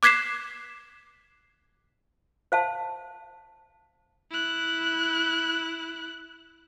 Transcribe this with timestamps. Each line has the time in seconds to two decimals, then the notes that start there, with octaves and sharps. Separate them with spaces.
0.03 D6 F#6 G#6 B6 C7 E7
2.52 C5 F5 A5
4.31 E4 F#6